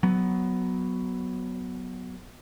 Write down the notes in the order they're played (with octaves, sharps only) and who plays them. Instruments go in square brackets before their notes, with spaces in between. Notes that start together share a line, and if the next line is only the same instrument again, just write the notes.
[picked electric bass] F#3 B3